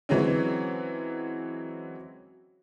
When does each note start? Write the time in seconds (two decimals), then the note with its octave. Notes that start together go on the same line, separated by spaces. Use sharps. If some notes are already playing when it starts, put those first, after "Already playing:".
0.09 E3 F#3 G#3 C4 C#4